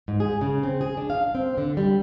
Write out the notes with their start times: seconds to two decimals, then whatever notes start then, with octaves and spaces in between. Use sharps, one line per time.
0.08 G#2
0.20 G#4
0.41 C#3
0.63 C4
0.81 G#4
0.97 D4
1.10 F5
1.35 C4
1.58 D3
1.77 G3